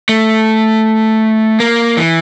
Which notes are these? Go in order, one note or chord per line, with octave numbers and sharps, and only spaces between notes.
A3
A#3
E3